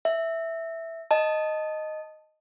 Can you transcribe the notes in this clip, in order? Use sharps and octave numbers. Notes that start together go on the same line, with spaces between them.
E5
D#5 A5